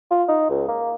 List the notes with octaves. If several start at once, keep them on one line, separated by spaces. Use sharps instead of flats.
F4
D#4
C#2
A#3